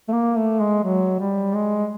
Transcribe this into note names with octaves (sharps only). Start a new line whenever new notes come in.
A3
A#3
A3
G#3
F#3
G3
G#3